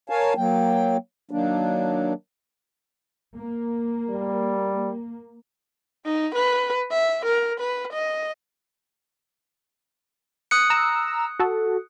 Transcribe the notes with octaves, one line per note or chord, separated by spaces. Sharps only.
A#4 C#5 F5 G#5 A5
F#3 A#3 G5
D#3 F#3 A#3 D4
A#3
G3
D#4
B4
E5
A#4
B4
D#5
D#6 F#6 C#7
A#5 E6
F#4 A4